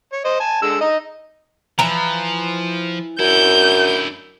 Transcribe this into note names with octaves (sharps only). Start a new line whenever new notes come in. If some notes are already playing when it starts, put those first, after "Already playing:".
C#5
C5 D#5
G#5 A5
D3 G#3 E6
D#4 D#5
E3 F3 A#5
F#2 D3 E4 G6